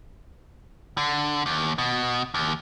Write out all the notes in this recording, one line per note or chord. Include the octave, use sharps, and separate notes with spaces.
D3
D#2
B2
D#2